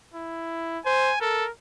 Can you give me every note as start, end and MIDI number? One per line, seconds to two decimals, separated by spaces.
0.14 0.79 64
0.86 1.13 72
0.86 1.20 80
1.21 1.45 69
1.21 1.51 70